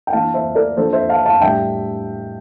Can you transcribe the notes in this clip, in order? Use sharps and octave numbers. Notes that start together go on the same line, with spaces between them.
G5
E3 A#3 D4 F5 A5
C5 E5
A#4 D5
F3 A#3 D4 A4 C5
C5 E5
F5 A5
F5 A5
A2 G3 D4 E5 G5